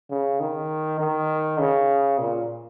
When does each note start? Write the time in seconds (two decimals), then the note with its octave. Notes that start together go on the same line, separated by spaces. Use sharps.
0.10 C#3
0.40 D#3
1.00 D#3
1.60 C#3
2.19 A#2